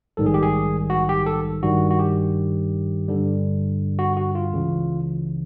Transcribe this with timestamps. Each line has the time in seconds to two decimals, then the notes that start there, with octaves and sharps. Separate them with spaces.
0.17 A#1 G#2 D#3 G3 A4
0.26 G#4
0.34 G4
0.43 G#4
0.90 F#4
1.09 G4
1.26 A4
1.63 G#1 G2 D#3 G3 F#4
1.91 F#4
1.99 G4
3.08 G2 D3 G3
3.99 F#4
4.17 F#4
4.35 F4
4.53 C#2 C#3 E3